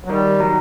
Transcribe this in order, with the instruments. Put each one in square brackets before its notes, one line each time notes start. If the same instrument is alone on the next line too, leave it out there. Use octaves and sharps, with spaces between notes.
[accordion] F#3
[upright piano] D#3 [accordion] G3
[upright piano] F#3